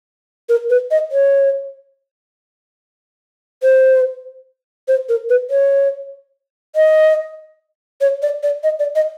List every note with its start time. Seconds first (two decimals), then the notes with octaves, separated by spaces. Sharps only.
0.49 A#4
0.70 B4
0.91 D#5
1.11 C#5
3.63 C5
4.88 C5
5.09 A#4
5.29 B4
5.50 C#5
6.76 D#5
8.01 C#5
8.22 D5
8.43 D5
8.63 D#5
8.79 D5
8.95 D#5